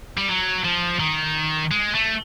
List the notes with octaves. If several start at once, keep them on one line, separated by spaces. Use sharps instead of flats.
G3
F#3
F3
D#3
G#3
A3